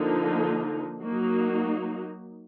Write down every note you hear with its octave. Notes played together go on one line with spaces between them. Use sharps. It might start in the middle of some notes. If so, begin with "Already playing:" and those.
Already playing: D3 F3 A#3 D#4
F#3 A#3 D#4 F#4